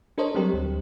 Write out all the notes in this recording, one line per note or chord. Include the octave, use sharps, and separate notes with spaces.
D4 A4 A#4 C5 C#5 D#5
F#3 G3 C4 G4 A#4
D2